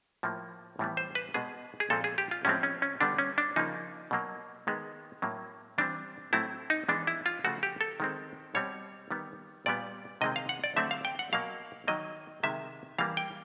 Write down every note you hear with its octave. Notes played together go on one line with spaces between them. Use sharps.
A2 F3 A#3
A2 E3 G3 B3
C5
B4
B2 G#3 B3 G#4
G#4
A#2 F3 G#3 C4 A4
G#4
G4
F4
A2 F3 G#3 C4 C#4
C#4
C#4
D3 G3 B3 D4
C#4
D4
C#3 F3 A#3 D#4
B2 F#3 A#3
D#3 G#3 B3
A2 F#3 A#3
E3 G3 C4 D4
A2 F#3 A3 C4 E4
D#4
E3 G#3 B3 D4
E4
F4
C#3 F3 A3 F#4
G4
A4
D#3 G#3 C4
B2 G3 C4 C#5
D#3 G3 B3
A#2 G3 B3 D5
C3 D#3 G#3 C4 D#5
F5
F#5
D5
D3 F#3 A3 C4 E5
F5
G5
F#5
B2 F#3 A#3 F5
D#3 F#3 A#3 D#5
C3 D#3 G#3 E5
E3 G3 A#3 F5
G5